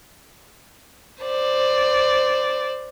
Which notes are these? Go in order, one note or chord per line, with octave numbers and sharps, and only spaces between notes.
C5 D5